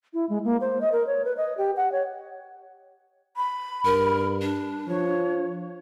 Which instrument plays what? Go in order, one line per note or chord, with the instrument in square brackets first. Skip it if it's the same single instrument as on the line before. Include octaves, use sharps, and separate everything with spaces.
[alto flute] E4
G#3
A#3
C5
D#5
A#4
C#5
B4
D#5
G4
F#5
C#5
[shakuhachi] B5
[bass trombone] G2 [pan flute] A#4
[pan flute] D4
[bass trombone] F3 [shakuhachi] C#5